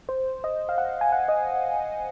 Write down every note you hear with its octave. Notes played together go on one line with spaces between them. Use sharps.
C5
D#5
F5
F#5
G#5
F#5
D#5